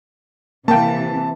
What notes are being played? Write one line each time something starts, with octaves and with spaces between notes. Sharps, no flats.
C3 E3 A#3 G5 A5